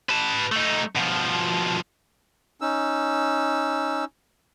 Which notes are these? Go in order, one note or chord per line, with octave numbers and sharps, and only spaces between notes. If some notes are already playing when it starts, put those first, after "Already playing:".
B4 A5
A3 D#4
B2 F3
C#4 D#4 E6